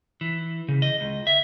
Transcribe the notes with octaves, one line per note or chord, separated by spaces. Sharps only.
E3
C#3
D#5
C#2
E5